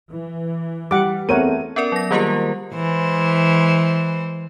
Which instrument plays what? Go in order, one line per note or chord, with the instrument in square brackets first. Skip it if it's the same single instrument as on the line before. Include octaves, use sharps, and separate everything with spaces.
[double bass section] E3
[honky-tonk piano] G3 [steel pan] F#5 D6
[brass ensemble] E2 A3 [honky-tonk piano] C4 D#7 [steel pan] A#4 C#5 F#5
[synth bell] B3 C#4 A#4 D5
F#3 A#6
D#3 G3 A#3 F4 G4 A#4
[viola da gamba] E3 G#3 C5